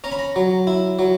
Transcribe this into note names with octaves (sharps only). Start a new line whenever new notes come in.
C#4 A#5
B5
A#5
F#3
E4
F#3